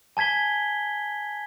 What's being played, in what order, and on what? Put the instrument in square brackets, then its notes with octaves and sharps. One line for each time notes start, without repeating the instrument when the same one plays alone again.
[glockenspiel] G#5 A5 G#6 B6 G7